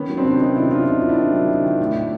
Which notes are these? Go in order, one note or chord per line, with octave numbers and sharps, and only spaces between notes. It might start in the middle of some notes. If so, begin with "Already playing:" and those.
Already playing: D#3 B3 C#4
F#3
C4 D4
C3
D#3 C#4 D#4
C3 D4 E4
C3 D#4 F4
C3
C3
D4 E4
D#3
F#3
C3
D#3
A2
A2